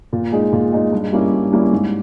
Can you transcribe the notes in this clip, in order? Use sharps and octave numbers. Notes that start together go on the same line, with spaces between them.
A#2
G#3 D#4 G#4
A#2
G#3 D#4 G#4
G2
G3 A#3 C#4 E4
G2
G3 A#3 C#4 E4
G#2